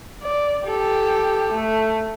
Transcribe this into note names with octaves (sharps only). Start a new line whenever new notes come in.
D5
G4 A4
A3